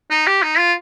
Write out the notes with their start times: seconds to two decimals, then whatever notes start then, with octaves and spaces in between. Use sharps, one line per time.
0.10 D#4
0.27 G4
0.43 D#4
0.58 F4